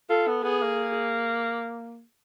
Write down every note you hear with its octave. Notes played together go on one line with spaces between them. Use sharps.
F4 A4
B3
B3 G#4
A#3